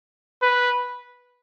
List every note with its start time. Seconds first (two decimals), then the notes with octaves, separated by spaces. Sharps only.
0.43 B4